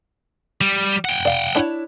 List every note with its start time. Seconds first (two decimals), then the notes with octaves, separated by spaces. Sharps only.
0.61 G3
1.05 F#5 G5
1.25 D5 F5
1.55 D4 E4 C#5